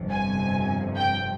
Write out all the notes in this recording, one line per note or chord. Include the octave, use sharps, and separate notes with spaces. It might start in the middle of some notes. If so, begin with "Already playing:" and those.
Already playing: G1 F2 C3 F3
G#5
G5